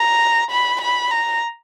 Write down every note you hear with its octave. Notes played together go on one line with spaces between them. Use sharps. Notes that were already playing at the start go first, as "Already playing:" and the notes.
Already playing: A#5
B5
B5
A#5